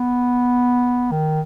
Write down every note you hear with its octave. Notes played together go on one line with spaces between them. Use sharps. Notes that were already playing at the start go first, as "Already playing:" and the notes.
Already playing: B3
D#3